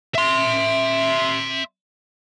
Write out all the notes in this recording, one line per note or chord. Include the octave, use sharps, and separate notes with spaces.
E5 C6